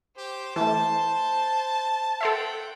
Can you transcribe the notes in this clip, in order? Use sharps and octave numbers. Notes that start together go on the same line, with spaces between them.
G4 C5
E3 A3 A5
A4 C5 E5 F#5 G5